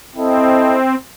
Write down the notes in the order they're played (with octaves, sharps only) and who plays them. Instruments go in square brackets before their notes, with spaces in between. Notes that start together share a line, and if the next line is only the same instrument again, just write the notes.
[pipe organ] C4 [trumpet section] E4 A4 D#5